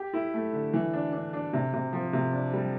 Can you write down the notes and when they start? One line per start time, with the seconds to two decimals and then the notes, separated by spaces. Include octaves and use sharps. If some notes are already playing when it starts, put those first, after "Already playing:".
Already playing: G4
0.14 E4
0.34 A3
0.53 D3
0.74 E3
0.93 D4
1.13 D4
1.33 D4
1.53 C3
1.73 C3
1.93 F3
2.13 C3
2.33 D4
2.53 G3